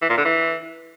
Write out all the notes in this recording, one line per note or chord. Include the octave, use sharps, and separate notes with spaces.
E3
A#2
D3
E3